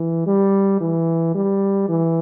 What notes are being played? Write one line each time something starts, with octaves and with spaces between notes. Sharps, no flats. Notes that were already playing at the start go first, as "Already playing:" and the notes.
Already playing: E3
G3
E3
G3
E3